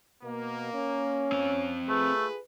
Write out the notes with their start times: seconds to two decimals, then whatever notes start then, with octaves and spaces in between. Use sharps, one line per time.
0.23 B2 A#3
0.74 C#4
1.32 C4 F5
1.89 A3 F4 G#4 A4 B4